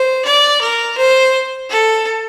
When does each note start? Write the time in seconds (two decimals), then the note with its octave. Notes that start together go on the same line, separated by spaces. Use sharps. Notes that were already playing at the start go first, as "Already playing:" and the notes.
Already playing: C5
0.25 D5
0.61 A#4
0.98 C5
1.70 A4